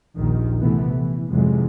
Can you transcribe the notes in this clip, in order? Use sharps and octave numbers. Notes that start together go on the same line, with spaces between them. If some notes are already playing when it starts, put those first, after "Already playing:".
A#1 D#2 D#3
C3 E3 A3 B3
E3
F2 G#2 C3 E3 F#3 G#3